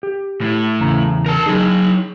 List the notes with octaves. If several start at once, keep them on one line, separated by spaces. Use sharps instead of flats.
G4
A2
E2 C#3 A#5
A#4 A5
F#3 D#4 G#4